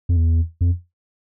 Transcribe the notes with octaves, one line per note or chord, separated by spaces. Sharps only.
F2
E2
F2